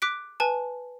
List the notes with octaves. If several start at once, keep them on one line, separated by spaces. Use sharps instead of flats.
D6 F#6 B6 D7
B4 G#5 A5